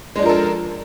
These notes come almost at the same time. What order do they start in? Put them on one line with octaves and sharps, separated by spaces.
G#3 D4 F3 A#4 A4